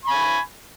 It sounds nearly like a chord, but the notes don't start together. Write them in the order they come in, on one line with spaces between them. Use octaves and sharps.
C#6 B5 G#5